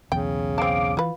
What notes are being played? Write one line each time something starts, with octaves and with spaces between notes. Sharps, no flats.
B1 E2 C#3 G5
C4 F5 A5 D6
E3 F4 B4